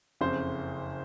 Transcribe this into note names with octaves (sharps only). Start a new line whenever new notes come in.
F#1 F2 C#3 C5